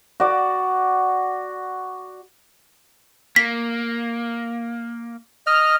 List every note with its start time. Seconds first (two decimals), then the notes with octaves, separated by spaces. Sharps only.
0.20 F#4 D5
3.36 A#3 B6
5.47 D#5 F6